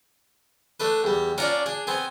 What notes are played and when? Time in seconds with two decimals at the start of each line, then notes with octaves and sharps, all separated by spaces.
0.80 A3 D4 B4
1.04 E2 G3
1.38 C#4 D4 F4 D5 A#5
1.66 D4 G#4
1.87 B3 C4 G#5